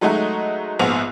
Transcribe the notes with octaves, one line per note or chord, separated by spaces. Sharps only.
F#3 G#3 A3 D#4 F#4
A#1 G#2 B3 F#5 F7